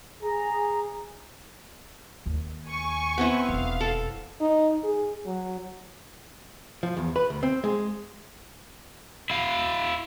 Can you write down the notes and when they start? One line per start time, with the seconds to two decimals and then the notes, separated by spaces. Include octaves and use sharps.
0.22 G#4 A#5
2.26 D#2
2.66 G#5 C#6
3.18 B3 C4 E4
3.49 E1 F2 F5
3.81 A4
4.41 D#4
4.84 G#4
5.26 F#3
6.83 F3
6.97 E2
7.16 B4
7.30 D2
7.43 C4
7.64 G#3
9.30 E4 F5